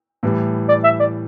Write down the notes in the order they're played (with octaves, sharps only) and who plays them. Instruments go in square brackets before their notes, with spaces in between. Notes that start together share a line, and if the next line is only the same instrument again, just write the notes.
[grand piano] A2 E3 G3
[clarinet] D5
E5
D5